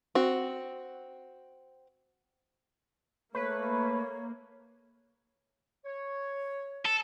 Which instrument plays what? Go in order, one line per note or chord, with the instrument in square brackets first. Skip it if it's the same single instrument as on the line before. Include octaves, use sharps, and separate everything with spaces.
[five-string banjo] C4 F#4
[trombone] A3 [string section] A#3 [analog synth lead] B4 [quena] C#5
[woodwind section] C#5
[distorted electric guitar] A4